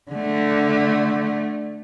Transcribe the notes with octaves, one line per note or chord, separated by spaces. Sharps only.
D3 A3